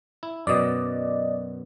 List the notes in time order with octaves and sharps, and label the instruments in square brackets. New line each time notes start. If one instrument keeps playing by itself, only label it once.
[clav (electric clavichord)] E4
[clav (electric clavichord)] F#2 B2 [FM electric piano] D5 D#5